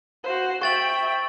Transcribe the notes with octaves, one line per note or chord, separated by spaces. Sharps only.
F#4 C5
E5 G5 C#6 A6 F#7